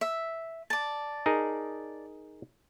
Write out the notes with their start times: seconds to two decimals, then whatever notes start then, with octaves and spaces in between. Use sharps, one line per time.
0.01 E5
0.70 D5 A5
1.26 D#4 G#4 A#4